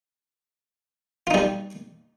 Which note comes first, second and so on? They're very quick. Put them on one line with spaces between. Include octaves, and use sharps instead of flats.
F4 D#4 G3